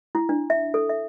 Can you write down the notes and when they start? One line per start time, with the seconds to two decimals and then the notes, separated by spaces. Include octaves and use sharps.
0.15 E4
0.29 D4
0.50 E5
0.74 A4
0.89 E5